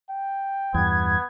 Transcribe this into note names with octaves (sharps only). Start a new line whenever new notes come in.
G5
E2 G2 B3 G#6